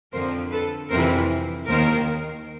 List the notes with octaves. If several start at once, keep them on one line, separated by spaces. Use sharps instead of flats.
F2 D3 F3 A#4 C5
A4 B4
F2 C3 E3 A#4 C5
D#2 D#3 A#4 C5